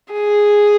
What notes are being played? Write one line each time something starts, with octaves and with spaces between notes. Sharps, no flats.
G#4